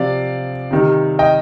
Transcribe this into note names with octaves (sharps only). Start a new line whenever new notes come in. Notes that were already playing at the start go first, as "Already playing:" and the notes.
Already playing: C3 F3 D5 F5
C3 D#3 G3
D#5 G5